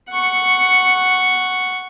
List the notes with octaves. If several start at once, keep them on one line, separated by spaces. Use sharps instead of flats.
F#5 C#6